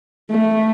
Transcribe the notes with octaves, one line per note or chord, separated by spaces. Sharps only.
A3